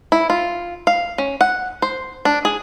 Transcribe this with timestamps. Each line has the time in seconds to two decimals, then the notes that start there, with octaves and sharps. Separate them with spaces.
0.12 E4
0.30 F4
0.87 F5
1.18 C#4
1.41 F#5
1.82 C5
2.25 D4
2.45 G#4